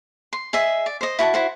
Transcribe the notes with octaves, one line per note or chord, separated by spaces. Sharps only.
C6
G#4 D#5 E5
D5
C5 D#5
E4 F#4 G#5 A5
E4 F#4 C5